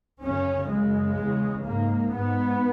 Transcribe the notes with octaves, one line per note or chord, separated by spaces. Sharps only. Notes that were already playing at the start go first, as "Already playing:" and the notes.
F#2 C#3 C#4
F#2 C#3 G#3
E2 C#3
G#2 A#3
G#2 B3